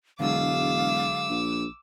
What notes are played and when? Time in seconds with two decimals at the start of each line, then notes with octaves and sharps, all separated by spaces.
0.20 E1 D3 F#3 G#3 F5 D6 E6
1.29 A#1